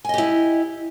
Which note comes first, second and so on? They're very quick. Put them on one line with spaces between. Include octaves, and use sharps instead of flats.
G#5 D#5 G4 E4